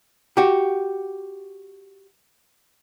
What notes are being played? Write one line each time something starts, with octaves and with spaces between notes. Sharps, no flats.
F#4 G4